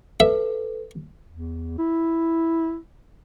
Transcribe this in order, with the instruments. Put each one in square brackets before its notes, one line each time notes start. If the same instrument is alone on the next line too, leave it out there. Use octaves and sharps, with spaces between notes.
[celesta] A4 B4 [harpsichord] E5
[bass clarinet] E2
E4